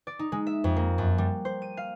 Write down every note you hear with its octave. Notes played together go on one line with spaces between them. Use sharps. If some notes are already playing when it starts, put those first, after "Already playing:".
D5
D#4
G#3
E5
F2
A#3
F#2
G3
C5
D#7
F5